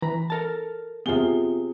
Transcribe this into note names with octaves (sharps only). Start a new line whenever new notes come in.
E3 A#5 B5
A4 A#4 A5
C3 B3 F4 G#4 G7